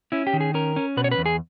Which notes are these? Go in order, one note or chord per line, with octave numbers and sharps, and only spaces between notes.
C#4 E4
G4
D#3
G#4
C#4 A#4
C#4
B2 B4
C#5
B4
E2
G#4